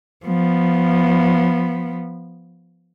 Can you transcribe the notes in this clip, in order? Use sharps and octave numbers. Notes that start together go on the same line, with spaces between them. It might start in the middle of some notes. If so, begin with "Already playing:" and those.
F3 B3